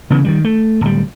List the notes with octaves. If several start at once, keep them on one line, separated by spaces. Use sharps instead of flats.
C#3 E3 B3
D#3 E3 G3
A3
D1 G3